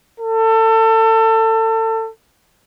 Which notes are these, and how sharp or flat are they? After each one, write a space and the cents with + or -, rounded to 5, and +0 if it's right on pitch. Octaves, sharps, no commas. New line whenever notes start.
A4 +25